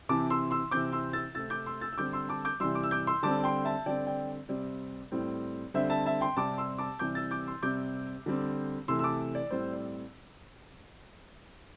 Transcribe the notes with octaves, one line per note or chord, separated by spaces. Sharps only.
C3 E3 C4 A5 D6
C6 E6
C6 E6
C3 E3 C4 D6 G6
C6 E6
E6 A6
C3 A3 C4 E6 A6
D6 G6
C6 E6
E6 A6
E6
D3 G3 C4 D6 G6
C6 E6
A5 D6
D6 G6
C3 E3 G3 C6 E6
D6
E6
D6 G6
C6 E6
D3 G3 C4 A5 D6
G5 C6
E5 A5
D3 G3 C4 D5 G5
D5 G5
C3 G3 C4 D5
A2 G3 C4
D3 G3 C4 C5 E5
E5 A5
E5 A5
G5 C6
C3 G3 C4 A5 D6
C6 E6
A5 D6
C3 E3 G3 C4 D6 G6
E6 A6
D6 G6
C6 E6
C3 G3 C4 D6 G6
D3 G3 C4
C3 E3 A3 C6 E6
E6
A5 D6
D5
A2 G3 C4 C5
D5